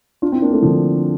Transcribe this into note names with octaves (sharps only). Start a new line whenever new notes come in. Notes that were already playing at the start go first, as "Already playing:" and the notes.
D4 F4
C4 E4
A#3 D4
A3 C4
D3 F3